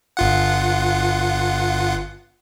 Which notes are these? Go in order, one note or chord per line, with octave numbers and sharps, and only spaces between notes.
G1 F4 F#5